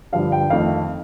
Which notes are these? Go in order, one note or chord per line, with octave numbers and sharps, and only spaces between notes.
G2 D3 F3 F5
G5
F2 D#3 A3 F5